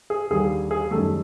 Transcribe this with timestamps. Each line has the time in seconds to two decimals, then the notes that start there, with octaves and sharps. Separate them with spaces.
0.10 G#4
0.30 D#2 D3 G3 G#4
0.71 G#4
0.91 F#2 D#3 G3 A3 A4